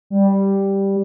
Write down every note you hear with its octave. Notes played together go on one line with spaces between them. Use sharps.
G3